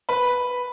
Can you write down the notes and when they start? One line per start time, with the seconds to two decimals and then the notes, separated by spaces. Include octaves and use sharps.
0.09 B4